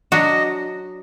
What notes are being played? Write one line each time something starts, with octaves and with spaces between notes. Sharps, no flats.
F#3 D4 F#4 D#5